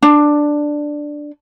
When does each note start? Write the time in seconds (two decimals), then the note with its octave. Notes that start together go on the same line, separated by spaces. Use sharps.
0.03 D4